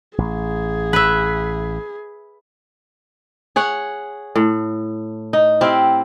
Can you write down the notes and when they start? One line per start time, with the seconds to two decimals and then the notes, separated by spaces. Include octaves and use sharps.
0.18 A1 G#4
0.93 B4 E5
3.56 G#4 C#5 F#5
4.35 A2
5.33 D#4
5.61 C4 E4 G4 F5